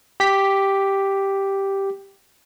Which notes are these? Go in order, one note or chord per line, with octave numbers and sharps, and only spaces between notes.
G4 B6